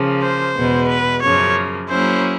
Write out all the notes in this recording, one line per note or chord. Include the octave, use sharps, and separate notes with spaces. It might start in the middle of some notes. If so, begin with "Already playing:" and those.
Already playing: C#3 F3 A#3
C5
E2 B2 G#3 B3
B4
F#2 C#3 F3 A#3 C#5
F#3 A#3 C#4 E4 G#4 C5